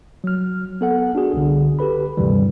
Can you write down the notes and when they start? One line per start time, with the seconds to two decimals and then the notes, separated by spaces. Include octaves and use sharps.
0.24 F#3 F6
0.81 B3 A4 F#5
1.15 D4 F#4 G#4
1.33 C2 D3
1.79 G4 A4 B4 B5
2.17 D2 G2 C3 D#3 E3 G3